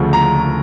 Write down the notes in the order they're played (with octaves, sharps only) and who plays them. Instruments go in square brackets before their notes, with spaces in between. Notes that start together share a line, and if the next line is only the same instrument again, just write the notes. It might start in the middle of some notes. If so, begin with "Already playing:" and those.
Already playing: [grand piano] D2 C#3 F3 A3
A#5